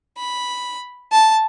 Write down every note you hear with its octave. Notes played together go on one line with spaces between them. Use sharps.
B5
A5